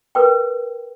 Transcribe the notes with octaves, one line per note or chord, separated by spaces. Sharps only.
A#4 B4 G5